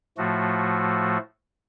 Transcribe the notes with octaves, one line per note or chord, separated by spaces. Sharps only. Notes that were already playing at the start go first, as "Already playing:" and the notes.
A2 F3 A3 F#4